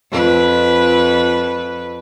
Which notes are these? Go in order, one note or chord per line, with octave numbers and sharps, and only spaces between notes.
F2 B4